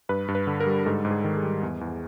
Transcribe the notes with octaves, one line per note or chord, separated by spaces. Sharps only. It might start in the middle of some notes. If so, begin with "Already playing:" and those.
G2 B4
G2
B4
D3
A#4
G3
G#2 A4
G#2
G#4
D#3
G#4
G3
E2
E2